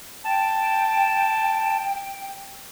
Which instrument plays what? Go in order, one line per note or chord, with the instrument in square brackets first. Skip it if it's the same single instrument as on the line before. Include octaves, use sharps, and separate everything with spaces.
[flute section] G5 [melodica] A5